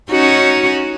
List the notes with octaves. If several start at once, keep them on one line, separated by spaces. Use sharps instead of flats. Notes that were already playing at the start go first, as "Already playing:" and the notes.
C#4 D#4 F#4